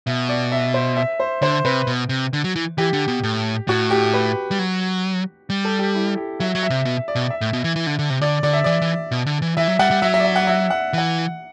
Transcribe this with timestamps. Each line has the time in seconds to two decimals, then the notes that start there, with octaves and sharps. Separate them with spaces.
0.07 B2 E5
0.29 D5
0.52 E5
0.74 C5
0.97 E5
1.20 C5
1.42 D3 C5
1.65 C3 B4
1.87 B2
2.09 C3
2.33 D3
2.44 F#3
2.56 E3
2.78 E3 G4
2.93 D3
3.08 B2
3.23 A2
3.68 A2 F#4
3.90 G4
4.14 B4
4.51 G3
4.59 F#3
5.50 G3
5.65 A4
5.79 G4
5.95 E4
6.17 G4
6.40 F#3 E5
6.55 F#3
6.63 E5
6.70 C3
6.85 B2
7.08 D5
7.15 B2
7.30 E5
7.41 A2
7.53 B2
7.64 E3
7.76 E3
7.87 D3
7.99 D3
8.10 C3
8.21 D3 D5
8.43 D3 D5
8.53 E5
8.64 E3 D5
8.82 E3
9.11 B2
9.26 D3
9.42 E3
9.57 E3 E5
9.68 F#3
9.79 G3 F#5
9.91 G3
10.02 F#3 E5
10.14 E5
10.20 D5
10.25 E5
10.36 F#5
10.47 E5
10.70 F#5
10.93 E3 F#5